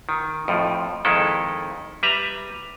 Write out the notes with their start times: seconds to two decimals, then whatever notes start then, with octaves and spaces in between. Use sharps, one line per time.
0.09 D#3
0.48 F2 A2 F3
1.05 F2 D#3 G#3 E4 A4
2.03 G3 B4 E5 A#5